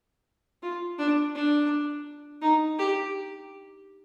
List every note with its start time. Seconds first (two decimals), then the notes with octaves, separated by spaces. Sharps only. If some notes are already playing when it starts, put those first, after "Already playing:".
0.62 F4
0.98 D4
1.35 D4
2.42 D#4
2.79 G4